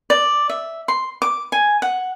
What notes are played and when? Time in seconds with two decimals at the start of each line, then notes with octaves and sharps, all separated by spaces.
0.10 D5
0.50 E5
0.88 C6
1.22 D6
1.52 G#5
1.82 F#5